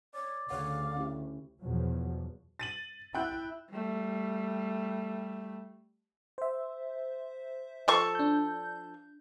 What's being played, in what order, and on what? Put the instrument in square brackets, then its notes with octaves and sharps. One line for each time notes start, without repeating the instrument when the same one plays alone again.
[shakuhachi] C#5 [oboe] D5
[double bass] D2 [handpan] C#3 C#5 F#5 [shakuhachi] F5
[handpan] C#4 E4 G4
[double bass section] E2 B2 F3 F#3
[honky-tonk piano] A6 D#7 F#7
[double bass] E4 [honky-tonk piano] G5 F#6 G6
[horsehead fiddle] G3 A3
[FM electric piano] C5 E5
[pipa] F3 A4 C#6
[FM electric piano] D4 G6